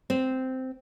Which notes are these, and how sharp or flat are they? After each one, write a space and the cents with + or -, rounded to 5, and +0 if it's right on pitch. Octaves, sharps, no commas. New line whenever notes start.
C4 -10